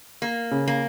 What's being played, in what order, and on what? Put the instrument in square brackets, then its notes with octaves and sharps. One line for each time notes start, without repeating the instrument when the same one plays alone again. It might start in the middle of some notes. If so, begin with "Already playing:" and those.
[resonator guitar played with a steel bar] A#3
[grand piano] C#3
[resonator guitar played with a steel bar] A#3